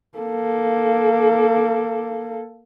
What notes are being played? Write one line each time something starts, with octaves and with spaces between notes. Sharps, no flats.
A#3 A4